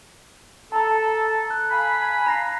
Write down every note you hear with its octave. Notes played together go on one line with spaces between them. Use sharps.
A4 A5 A#5
F#6
F5 G#5 B5
A#5 A#6 C7